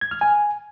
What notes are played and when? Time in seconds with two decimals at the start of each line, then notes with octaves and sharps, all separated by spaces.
0.01 G#6
0.11 F6
0.21 G#5